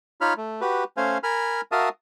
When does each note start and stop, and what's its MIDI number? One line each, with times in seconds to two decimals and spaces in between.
0.21 0.34 63
0.21 0.34 65
0.21 0.34 73
0.21 0.34 83
0.21 0.34 89
0.37 0.61 57
0.61 0.84 66
0.61 0.84 67
0.61 0.84 71
0.97 1.18 57
0.97 1.18 61
0.97 1.18 72
0.97 1.18 77
0.97 1.18 80
1.23 1.61 70
1.23 1.61 80
1.23 1.61 83
1.23 1.61 89
1.72 1.89 66
1.72 1.89 70
1.72 1.89 76
1.72 1.89 77
1.72 1.89 81
1.72 1.89 87